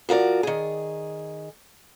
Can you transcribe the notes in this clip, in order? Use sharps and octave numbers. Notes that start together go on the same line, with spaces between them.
F3 F#4 A#4 D5
D#3 G#4